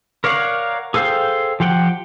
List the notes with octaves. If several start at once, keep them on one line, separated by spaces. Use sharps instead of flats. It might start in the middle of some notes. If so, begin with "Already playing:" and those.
A#4 C#5 D5 F5 F#5
G#4 A4 C5 F5 G5
F3 G4 F#5 G5